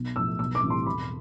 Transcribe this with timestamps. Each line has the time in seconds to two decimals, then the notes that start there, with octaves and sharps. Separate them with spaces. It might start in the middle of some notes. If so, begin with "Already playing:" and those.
Already playing: B1
0.16 A2 F3 E6
0.39 B1 E6
0.55 D6
0.63 A2 E3 G3 C4
0.70 C6
0.86 E1 B5